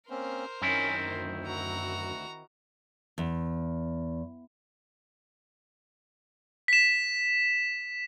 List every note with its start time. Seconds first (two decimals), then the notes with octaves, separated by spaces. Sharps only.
0.10 A#3 C4 C#4 A#4 C5
0.62 F#2 D#3 C4 C#4 E4
1.05 D2
1.45 F#4 A#5
3.18 E2
6.68 B6 E7